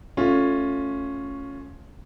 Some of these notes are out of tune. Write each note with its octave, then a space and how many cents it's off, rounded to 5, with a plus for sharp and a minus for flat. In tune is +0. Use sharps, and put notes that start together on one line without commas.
A3 +0 C#4 +0 F4 +15